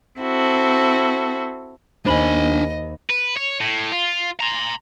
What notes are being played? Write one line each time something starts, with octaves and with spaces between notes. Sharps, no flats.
C4 E4 F#4 A4
D#2 D4 C5 D#5 G#5 B5 F#7
B4
C#5
A2
F4
A#5 C6